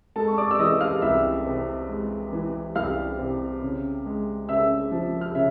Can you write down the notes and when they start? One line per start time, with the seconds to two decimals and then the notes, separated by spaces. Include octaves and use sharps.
0.16 G#3 A4 A5
0.27 C#6
0.38 D5 D6
0.51 E6
0.59 E3 D#5 D#6
0.81 F5 F6
1.02 C2 E5 E6
1.46 C3
1.89 G#3
2.33 E3
2.75 C2 F5 F6
3.19 C3
3.62 C#3
4.06 G#3
4.49 C#3 E5 E6
4.92 F3
5.21 F6
5.35 C#3 E5